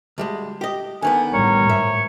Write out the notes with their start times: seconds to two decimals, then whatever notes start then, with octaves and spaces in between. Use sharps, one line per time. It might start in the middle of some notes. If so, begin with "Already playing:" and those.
0.18 D2 G3 G#3
0.61 G4 D#5
1.02 D3 D#3 B3 G#5
1.33 A1 G3 A#4 C#5
1.69 G#2 E5